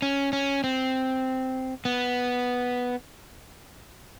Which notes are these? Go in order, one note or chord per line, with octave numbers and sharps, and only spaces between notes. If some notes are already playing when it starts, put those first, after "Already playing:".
C#4
C#4
C4
B3